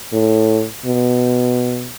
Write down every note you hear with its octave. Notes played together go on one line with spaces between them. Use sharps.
A2
B2